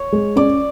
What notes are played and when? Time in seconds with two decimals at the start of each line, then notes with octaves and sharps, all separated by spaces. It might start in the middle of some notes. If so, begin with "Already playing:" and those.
Already playing: C#5
0.12 G#3
0.36 C#4 D5